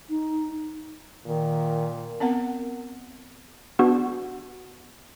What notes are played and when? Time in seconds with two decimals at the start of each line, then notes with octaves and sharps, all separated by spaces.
0.10 D#4
1.26 A#2 D#3
2.20 B3 C4 A#4 F#5
3.79 B3 D4 F#4 G#4